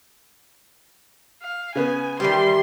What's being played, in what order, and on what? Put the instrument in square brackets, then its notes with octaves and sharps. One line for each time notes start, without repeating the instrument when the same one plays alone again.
[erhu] F5
[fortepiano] C#3 B3 [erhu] G#5
[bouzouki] D#3 E3 G4 [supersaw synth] G3 [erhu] C6